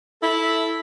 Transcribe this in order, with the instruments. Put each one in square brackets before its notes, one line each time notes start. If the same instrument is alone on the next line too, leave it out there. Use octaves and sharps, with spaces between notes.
[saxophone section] E4 A4